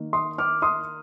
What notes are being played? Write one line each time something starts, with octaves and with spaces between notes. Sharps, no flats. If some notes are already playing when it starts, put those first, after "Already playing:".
Already playing: D#3 A#3 D#4
C6 D#6
D6 F6
C6 D#6